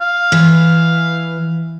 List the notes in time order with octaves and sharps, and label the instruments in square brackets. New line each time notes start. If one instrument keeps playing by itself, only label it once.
[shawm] F5
[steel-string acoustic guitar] E3